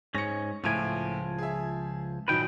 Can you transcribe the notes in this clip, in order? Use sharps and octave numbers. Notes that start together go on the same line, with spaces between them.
G#2 C#4 A#6 C#7
C#2 A2 F3 E5 G#5 D7
G#4 E5
A#1 D#3 F#3 B4 G5